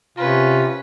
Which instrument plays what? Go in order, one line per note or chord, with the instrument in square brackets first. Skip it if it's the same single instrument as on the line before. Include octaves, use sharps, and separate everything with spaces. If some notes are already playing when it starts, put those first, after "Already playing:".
[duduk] C3 [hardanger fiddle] C#4 B4 [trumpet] F4